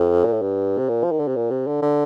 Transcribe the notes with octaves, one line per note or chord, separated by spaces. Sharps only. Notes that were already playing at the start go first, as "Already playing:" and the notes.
Already playing: F2
A#2
A2
G2
C3
A#2
F3
D#3
D3
C3
A#2
C3
D3
D3